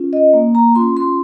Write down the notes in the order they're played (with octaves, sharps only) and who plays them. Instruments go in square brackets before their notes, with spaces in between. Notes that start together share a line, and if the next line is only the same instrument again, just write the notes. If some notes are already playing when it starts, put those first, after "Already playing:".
Already playing: [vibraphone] C#4 F4
D#5
A#3
A#5
C#4 F4 C6
C6